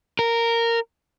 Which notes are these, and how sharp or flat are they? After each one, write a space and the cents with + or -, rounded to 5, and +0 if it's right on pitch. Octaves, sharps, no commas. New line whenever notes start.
A#4 -10